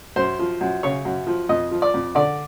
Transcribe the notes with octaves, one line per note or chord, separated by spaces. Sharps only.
F#2 C5
F3
F#2
C#3 C#5
F#2
F3
F2 D#5
F3
D5
F2
D3 D5